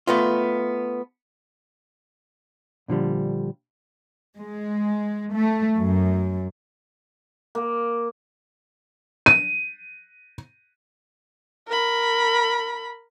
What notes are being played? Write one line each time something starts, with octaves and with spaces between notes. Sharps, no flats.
A3 B3 F4
A#2 D3 F3 G3
G#3
A3
F#2
A#3
D#7
A#4 B5